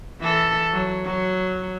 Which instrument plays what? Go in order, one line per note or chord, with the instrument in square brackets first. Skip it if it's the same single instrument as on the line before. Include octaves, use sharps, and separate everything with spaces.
[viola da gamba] E3 A4
F#3
F#3